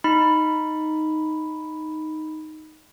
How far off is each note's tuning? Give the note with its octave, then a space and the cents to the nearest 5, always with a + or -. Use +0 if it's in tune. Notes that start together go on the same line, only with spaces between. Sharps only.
D#4 +0 B5 +0